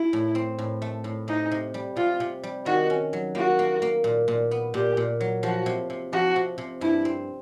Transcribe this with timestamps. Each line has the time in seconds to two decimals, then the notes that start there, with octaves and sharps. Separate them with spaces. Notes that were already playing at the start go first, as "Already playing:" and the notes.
Already playing: E4
0.13 A2
0.35 C4
0.59 A2
0.82 A3
1.04 A2
1.28 C3 D#4
1.51 C3
1.74 G3
1.96 C3 F4
2.20 C3
2.43 G3
2.66 D#3 F#4
2.90 C#4
3.13 F#3
3.35 A#3 F#4
3.59 A#3
3.82 A#3
4.04 A#2
4.28 A#2
4.51 B3
4.74 A#2 G4
4.97 A#2
5.21 F#3
5.43 F3 F#4
5.66 C3
5.90 C3
6.13 F3 F#4
6.36 C3
6.58 C3
6.81 G2 E4
7.05 C4